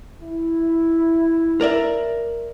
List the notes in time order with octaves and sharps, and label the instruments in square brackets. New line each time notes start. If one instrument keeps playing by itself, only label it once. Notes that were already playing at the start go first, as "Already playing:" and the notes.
[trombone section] E4
[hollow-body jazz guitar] A#4 D5 E5